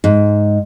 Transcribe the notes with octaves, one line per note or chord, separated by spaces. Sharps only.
G#2